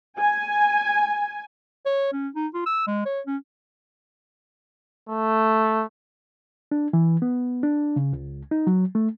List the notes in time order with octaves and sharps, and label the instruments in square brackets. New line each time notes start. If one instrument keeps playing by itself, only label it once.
[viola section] G#5
[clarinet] C#5
C#4
D#4
F4
E6
G#3
C#5
C#4
[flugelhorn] A3
[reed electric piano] D4
E3
B3
D4
C#3
C#2
D#4
F#3
A3